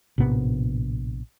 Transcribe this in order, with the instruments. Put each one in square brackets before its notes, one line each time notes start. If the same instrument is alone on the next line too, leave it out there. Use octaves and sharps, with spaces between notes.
[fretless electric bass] A#1 A2 C3 B3